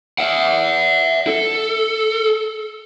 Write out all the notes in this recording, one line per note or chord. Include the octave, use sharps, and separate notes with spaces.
E5 F#5
A4